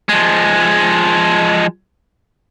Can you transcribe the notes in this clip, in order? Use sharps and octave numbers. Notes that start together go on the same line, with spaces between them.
F3 G#3